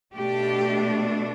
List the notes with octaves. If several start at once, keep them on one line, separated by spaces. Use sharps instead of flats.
B2 A3 D4 G4